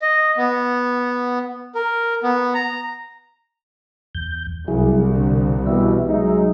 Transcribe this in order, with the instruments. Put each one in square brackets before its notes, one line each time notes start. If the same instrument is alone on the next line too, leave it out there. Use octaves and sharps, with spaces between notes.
[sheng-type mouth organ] D#5
B3
A#4
B3
A#5
[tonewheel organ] E2 G6
[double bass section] C2 [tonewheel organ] F#3 E4 G#4
[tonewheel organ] D3
[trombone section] B2 E3 G3 [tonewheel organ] E5
[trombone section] F#3 G#3 D#4